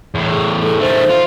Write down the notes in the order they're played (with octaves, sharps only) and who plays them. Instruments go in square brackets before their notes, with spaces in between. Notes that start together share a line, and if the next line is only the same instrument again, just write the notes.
[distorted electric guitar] E2 A2
[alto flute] G#4
A4
[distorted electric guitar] D#3 A3 [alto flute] C5
[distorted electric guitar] F4